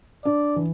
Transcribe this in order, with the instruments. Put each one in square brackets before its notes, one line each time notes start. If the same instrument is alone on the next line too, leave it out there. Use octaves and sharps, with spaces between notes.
[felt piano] D4 [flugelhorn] D5
[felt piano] E3